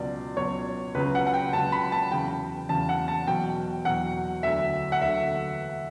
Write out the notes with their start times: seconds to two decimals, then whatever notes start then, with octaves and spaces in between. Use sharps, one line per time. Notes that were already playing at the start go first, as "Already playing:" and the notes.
Already playing: C#2 B2 F#3 D5
0.37 C#2 B2 F#3 C#5
0.95 C#2 C#3 F#3 B4
1.15 F#5
1.27 F#5
1.34 G5
1.53 C#2 C#3 F#3 A5
1.72 B5
1.92 A5
2.11 E2 C#3 F#3 G5
2.69 E2 C#3 F#3 A5
2.89 F#5
3.08 A5
3.27 E2 B2 F#3 G5
3.85 E2 B2 F#3 F#5
4.43 D2 D3 F#3 E5
4.92 F#5
5.02 D2 D3 F#3 E5